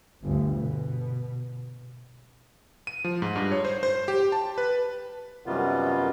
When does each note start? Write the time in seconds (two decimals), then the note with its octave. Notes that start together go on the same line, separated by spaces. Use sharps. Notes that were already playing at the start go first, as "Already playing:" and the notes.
0.23 G1 D2
0.54 B2
2.87 D#7
3.04 F3
3.22 G#2
3.36 G2
3.52 C#5
3.65 C5
3.83 C5
4.08 G4
4.32 A5
4.58 B4
5.46 F#2 C3 D#3 G3 B3 F4